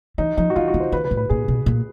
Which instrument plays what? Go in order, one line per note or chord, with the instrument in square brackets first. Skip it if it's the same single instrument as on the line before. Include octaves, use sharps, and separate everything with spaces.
[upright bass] E3 [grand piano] D#4
[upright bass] F3 [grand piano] D#4
[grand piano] F#4
[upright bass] E3 [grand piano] F4
[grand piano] F#4
[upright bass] D#3
[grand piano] C5
[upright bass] D#3 [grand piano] B4
[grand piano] B4
[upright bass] A2
[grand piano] B4
[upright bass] A#2 [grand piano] G#4
[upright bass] B2
A#2